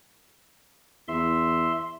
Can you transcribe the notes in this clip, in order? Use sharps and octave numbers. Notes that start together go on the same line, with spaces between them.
E2 E5 C6